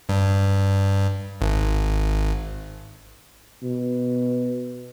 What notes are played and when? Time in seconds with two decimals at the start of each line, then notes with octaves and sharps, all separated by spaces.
0.09 G2
1.41 G#1
3.62 B2